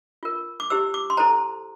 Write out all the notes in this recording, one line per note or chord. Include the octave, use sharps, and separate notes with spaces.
F4 A#4
D6
E4 G4 C5 E6
D6
C6
E4 A4 C5 A#5